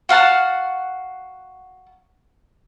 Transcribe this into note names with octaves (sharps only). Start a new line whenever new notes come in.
F#4 F5 F#5 A5